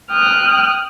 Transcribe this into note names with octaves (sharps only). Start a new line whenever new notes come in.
G5 D#6 F6 F#6